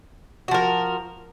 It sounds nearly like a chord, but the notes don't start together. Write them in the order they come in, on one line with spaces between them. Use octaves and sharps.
F#4 F3 A#4